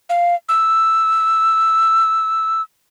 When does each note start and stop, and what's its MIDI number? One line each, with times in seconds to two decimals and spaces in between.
0.10 0.35 77
0.49 2.62 88